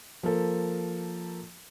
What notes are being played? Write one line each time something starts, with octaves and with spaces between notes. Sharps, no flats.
F3 A#3 A4